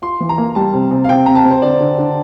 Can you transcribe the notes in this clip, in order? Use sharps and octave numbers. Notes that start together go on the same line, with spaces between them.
F4 C6
E3
A#5
A#3
G3 A5
C3
C3
F5
C3 G5
C3 A#5
A5
C4
C5
D3 D5
D3
D3